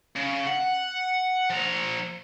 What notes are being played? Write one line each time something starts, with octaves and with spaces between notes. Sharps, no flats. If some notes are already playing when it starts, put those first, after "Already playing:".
C#3
F#5
F3 A#5